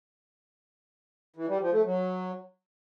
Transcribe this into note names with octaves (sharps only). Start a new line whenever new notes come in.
E3
G3
F3
A3
F#3